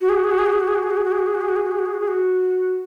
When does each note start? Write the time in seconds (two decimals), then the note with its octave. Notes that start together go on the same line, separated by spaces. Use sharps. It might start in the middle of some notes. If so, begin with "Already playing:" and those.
0.01 F#4
0.09 G#4
0.16 F#4
0.24 G#4
0.31 F#4
0.38 G#4
0.46 F#4
0.53 G#4
0.60 F#4
0.68 G#4
0.75 F#4
0.83 G#4
0.90 F#4
0.97 G#4
1.04 F#4
1.12 G#4
1.19 F#4
1.26 G#4
1.34 F#4
1.41 G#4
1.48 F#4
1.56 G#4
1.64 F#4
1.71 G#4
1.79 F#4
1.86 G#4
1.94 F#4
2.00 G#4
2.08 F#4